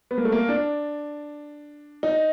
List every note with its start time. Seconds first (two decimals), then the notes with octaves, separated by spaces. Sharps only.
0.11 B3
0.18 A#3
0.25 A3
0.32 A#3
0.49 D4
2.03 D#4